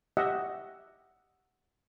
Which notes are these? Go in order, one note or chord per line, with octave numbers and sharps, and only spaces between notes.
G4 D#5 E5 F#5